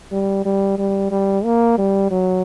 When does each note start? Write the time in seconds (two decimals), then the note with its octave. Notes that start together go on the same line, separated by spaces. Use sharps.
0.12 G3
0.45 G3
0.78 G3
1.11 G3
1.45 A#3
1.78 G3
2.11 F#3